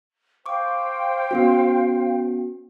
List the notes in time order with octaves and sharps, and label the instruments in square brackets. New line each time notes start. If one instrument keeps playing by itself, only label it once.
[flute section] C5 F5 G5 [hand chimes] C#6 D6
[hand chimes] B3 C#4 F#4